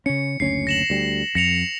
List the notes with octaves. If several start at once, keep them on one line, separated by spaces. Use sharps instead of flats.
C#3 C#4 C#7
F#1 D2 C#4 C7
A#6 E7 F#7
D2 G3
F2 A#6 C#7 F7